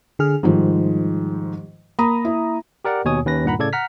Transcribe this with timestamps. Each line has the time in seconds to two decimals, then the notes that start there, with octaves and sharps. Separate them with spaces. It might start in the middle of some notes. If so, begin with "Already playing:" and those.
0.19 D3 G#4 F6
0.43 G#2 D#3 F3 G3
1.99 A#3 A#5 B5 D#6
2.25 E4
2.85 G4 A#4 D5 F#5
3.05 D#2 B2 C#5 G#5 D#6
3.25 D#2 C#4 B4 A#6
3.45 G2 A#2 D#3 F#5 A#5 B5
3.59 A2 C#3 A4 D5 G#6
3.73 F#5 A#5 F6 B6